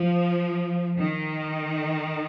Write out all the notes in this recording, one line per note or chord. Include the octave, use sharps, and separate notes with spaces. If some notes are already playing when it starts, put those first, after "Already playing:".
Already playing: F3
D#3